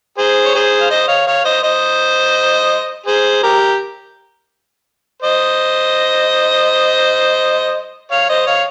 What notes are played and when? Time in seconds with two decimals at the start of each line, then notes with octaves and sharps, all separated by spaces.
0.18 G#4 C5
0.45 C#5
0.55 G#4 C5
0.81 F5
0.90 C5 D#5
1.08 C#5 F5
1.27 C#5 F5
1.44 C5 D#5
1.63 C5 D#5
3.06 G#4 C5
3.43 G4 A#4
5.22 C5 D#5
8.11 C#5 F5
8.29 C5 D#5
8.47 C#5 F5